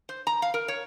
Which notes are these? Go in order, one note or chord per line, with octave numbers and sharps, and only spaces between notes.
C5
A#5
F5
A#4
C#5